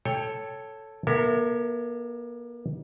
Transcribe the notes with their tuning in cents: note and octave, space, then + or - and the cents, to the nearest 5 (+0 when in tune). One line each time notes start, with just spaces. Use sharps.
A4 +0 C#5 +0 G5 +20
A#3 +40 A#4 -40 E5 +0